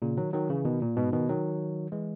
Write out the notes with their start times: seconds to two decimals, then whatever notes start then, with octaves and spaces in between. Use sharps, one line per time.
0.02 A#2 C#3
0.17 D#3 F#3
0.33 D#3 F#3
0.50 C#3 E3
0.65 B2 D#3
0.81 A#2
0.96 G#2 B2
1.13 B2 D#3
1.29 D#3 F#3
1.92 E3 G#3